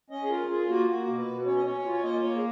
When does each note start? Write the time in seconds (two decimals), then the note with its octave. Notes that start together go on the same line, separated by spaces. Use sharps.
0.10 C#4 D#5
0.24 G#4
0.30 F4 A#4
0.50 F4 G#4
0.69 A#3 F#4
0.88 A#3 F#4
1.07 B2
1.17 B4
1.27 B2
1.46 C#4 C#5
1.55 D#5
1.65 C#4 C#5
1.85 F4
1.92 C#5
2.03 A#3 D#5
2.23 A#3 C#5
2.36 G#4